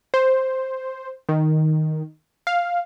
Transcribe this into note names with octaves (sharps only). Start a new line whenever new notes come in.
C5
D#3
F5